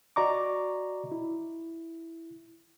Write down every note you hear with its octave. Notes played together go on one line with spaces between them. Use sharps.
F#4 D5 D#5 A#5 C#6 D6
E4